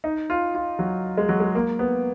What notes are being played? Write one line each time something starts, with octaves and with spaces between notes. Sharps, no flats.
D#4
F4
F4
F#3
G#3
F#3
G#3
A#3
B3